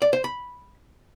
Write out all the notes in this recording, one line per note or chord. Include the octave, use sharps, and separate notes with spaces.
D5
C5
B5